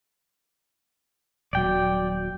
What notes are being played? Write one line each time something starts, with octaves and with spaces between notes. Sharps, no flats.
D#1 F#3 D5 G5